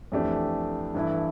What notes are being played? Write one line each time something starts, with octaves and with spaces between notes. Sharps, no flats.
F2 E3 A3 D4 G4
G2 E3 A3 E4